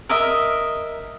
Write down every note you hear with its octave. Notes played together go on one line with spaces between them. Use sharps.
A#4 D#5 E5